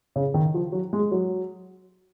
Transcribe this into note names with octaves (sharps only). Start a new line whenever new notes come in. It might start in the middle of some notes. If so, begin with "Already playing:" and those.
C#3
D#3
F3
F#3
G#3
F#3